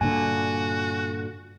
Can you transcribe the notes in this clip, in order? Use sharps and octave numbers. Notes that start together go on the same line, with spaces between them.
G2 A#2 D3 F#4 G#5